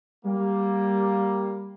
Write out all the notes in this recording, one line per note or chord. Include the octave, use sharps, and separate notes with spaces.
G3 A#3